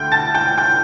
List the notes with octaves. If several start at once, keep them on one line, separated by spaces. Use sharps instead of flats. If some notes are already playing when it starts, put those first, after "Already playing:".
Already playing: D2 D3 A3 G5 G6
A5 A6
G5 G6
G5 G6